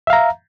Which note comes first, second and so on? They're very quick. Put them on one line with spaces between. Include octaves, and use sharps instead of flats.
E5 F5 A#5